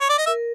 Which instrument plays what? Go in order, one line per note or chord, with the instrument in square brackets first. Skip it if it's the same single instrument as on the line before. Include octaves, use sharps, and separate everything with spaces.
[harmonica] C#5
D5
D#5
[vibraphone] A#4 [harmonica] E5